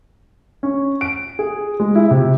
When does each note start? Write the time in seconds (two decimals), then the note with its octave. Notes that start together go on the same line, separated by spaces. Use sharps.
0.63 C#4
1.01 D7
1.39 G#4
1.80 G#3
1.95 E4
2.11 C3